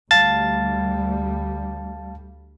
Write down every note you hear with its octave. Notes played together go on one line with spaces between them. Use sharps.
D2 G3 F5 A5 A6